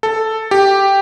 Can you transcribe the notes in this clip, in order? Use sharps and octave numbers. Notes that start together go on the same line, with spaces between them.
A4
G4